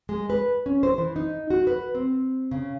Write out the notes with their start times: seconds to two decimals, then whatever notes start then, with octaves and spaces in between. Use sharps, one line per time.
0.09 G#3
0.30 B4
0.66 C#4
0.83 C5
0.98 E3
1.16 D#4
1.50 F#4
1.67 B4
1.95 C4
2.51 C#3